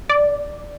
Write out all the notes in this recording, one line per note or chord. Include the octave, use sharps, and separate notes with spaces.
D5